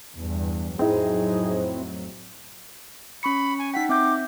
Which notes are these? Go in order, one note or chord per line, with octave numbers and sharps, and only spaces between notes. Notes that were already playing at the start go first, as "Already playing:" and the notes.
E2 G2
F2 A2 F#3 G#3 C4 D#4 E4 G#4
C#4 B5 C#6 C#7
G#5
D#4 F#5 G5 B6
C4 E5 D6 G6